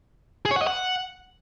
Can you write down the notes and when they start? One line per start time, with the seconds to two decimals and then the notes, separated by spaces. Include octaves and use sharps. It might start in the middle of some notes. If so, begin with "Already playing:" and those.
0.45 G#4
0.51 C#5
0.56 F#5
0.62 D#5
0.67 F#5